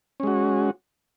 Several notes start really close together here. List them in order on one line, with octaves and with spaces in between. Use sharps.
C#4 G#3 F#4